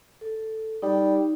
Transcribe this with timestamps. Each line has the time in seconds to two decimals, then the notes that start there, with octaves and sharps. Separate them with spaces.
0.21 A4
0.82 G3 D#4